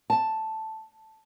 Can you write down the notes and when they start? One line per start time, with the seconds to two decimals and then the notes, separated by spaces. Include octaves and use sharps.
0.10 A5